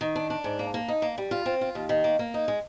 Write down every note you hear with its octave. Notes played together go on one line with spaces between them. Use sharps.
D#3
D4
D4
G#2
A#3
A#3
D#4
A#3
G3
F4
C4
F4
D#2
D#3
A#3
A#3
D#4
G#3